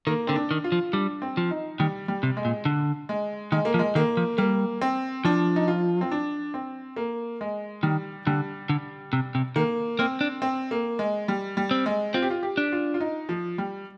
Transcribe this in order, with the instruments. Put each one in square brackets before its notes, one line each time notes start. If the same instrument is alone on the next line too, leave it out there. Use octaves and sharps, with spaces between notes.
[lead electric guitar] D#3 [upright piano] A#3
[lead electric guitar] D3 [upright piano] C4
[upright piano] D4
[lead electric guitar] D#3
[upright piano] F4
[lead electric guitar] F3
[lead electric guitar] G3 [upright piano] D4
[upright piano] C4
[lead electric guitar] F3
[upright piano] D#4
[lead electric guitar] D#3 [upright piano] G3
[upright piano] G3
[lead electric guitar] C3
[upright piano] G#3
[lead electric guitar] A#2
D3
[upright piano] G#3
[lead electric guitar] D#3 [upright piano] G#3
[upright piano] A#3
[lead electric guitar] F3
[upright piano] G#3
[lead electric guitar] D#3 [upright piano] A#3
[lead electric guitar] F3
[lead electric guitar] G3 [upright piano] A#3
[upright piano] C4
[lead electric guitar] F3 [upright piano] D4
[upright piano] D#4
F4
C4
D4
C4
A#3
G#3
[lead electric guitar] D#3 [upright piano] G3
[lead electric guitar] D3 [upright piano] G3
[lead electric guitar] D3
C3
C3
[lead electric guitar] D#3 [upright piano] A#3
[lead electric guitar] A#3 [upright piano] C4
[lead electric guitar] D4
[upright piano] C4
A#3
G#3
G3
G3
[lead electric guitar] C4
[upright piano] G#3
[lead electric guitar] C4 [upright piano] F4
[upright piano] G4
F4
G4
[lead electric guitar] D4
[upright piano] F4
F4
D#4
F3
G3